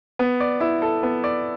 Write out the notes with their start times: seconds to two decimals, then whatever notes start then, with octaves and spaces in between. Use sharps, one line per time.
0.19 B3
0.40 D5
0.60 E4
0.82 A4
1.03 B3
1.24 D5